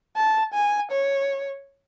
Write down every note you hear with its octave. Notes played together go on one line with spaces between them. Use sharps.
A5
G#5
C#5